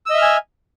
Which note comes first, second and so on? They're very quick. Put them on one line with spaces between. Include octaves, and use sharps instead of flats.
E6 D#5 E5 F6 G#5